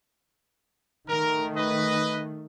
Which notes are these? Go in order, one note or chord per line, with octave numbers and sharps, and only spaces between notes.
D#3 A3 A#4
B4 D#5